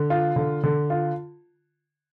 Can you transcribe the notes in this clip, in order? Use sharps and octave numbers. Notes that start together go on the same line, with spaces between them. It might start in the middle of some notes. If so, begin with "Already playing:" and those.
Already playing: D3
F4
D3
D3
F4